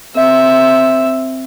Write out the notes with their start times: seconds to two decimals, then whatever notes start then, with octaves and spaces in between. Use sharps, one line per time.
0.16 C4 E5